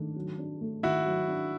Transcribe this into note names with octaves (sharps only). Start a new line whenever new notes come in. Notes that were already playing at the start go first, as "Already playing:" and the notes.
Already playing: D#3 A3 D4
F#3
D4
A3
D#3 E4 F#4
F#3
D4